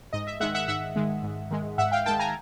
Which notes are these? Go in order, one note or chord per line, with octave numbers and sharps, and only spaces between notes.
G#2 D#5
E5
D#3 G#3 E5 F#5
E5 F#5
G#2 E5 F#5
D#3 G#3
G#2
D#3 G#3
G#2 E5 F#5
F5 G5
D#3 G#3 G5 A5
G#5 A#5